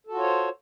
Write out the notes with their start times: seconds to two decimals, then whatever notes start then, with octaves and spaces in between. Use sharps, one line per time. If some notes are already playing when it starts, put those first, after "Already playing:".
0.07 A4
0.11 F#4
0.15 F4
0.19 C#5
0.23 C5